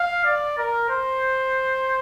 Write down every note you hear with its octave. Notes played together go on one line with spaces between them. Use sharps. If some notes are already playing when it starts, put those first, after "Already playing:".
Already playing: F5
D5
A#4
C5